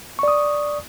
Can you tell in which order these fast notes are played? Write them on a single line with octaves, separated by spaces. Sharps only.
C#6 D5 D#6